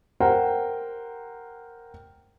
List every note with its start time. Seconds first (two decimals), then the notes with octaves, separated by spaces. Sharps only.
0.20 G4 A#4 C5 F#5 G5